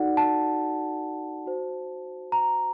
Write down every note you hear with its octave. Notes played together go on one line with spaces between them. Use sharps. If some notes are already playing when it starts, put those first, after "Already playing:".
Already playing: D#4 F#4 A4 D5 F#5
A5
F#4 C5
A#5